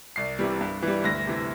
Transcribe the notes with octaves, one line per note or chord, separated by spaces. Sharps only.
C2 C7
C3 E3 G3
G2
E3
G3
D2 A#6
C3 E3